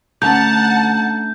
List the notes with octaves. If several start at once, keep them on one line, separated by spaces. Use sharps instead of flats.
D2 C#4 F#5 A5 A#5 G6